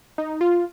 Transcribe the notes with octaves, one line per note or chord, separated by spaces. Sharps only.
D#4
F4